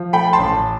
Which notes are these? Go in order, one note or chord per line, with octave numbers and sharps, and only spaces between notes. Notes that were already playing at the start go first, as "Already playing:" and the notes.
Already playing: F3
A3 G5 B5
A5 C6
A1